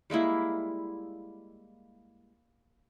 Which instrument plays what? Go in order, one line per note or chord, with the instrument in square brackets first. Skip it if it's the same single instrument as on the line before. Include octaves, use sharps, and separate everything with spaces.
[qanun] G3 G#3 A#3 E4